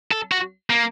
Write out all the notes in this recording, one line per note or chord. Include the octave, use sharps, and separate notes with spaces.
A4
F#4
A#3